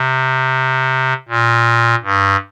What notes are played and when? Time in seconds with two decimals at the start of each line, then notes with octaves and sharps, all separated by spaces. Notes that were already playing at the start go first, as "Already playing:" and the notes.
Already playing: C3
1.29 A#2
2.03 G2